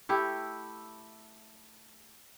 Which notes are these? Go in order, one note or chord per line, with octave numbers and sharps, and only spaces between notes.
A3 E4 G4